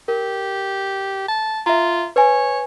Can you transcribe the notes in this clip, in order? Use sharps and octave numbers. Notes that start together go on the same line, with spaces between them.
G4 A#4
A5
F4 E5 A#5
B4 C#5 G#5